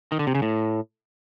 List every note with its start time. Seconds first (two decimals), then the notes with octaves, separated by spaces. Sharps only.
0.12 D#3
0.19 D3
0.27 C3
0.35 C#3
0.42 A2